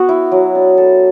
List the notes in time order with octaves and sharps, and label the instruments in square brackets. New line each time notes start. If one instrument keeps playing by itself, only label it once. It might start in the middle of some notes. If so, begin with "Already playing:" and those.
Already playing: [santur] B3 [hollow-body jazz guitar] F#4
[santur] E4
F#3
D4
A4